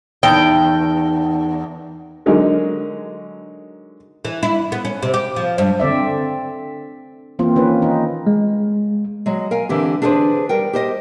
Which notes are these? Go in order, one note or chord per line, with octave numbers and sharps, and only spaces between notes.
E2 D#4 G5 A5
D3 F#3 G#3 D#4 A#4
E3
E4
B3
C#4
C3
G4
F3
G2
D3 C4 D5 E5
E3 A#3 C4 F4
D#3 A#3 C#4 B4
D#4
G#3
F#3 G#3
A#4 F5 G#5
D3 E3 C4 G4
D4 G#4 A4 B4 C5
G3 A#4 G5
G4 C5 D#5